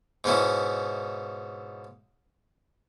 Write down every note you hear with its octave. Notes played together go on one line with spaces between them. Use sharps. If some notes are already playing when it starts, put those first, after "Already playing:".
G#2 B2 C#4 E4